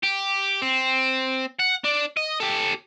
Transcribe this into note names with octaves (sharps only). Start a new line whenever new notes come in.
G4
C4
F#5
D4
D#5
G4 A4